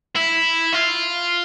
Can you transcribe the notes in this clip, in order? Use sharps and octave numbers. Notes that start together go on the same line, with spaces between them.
E4
F4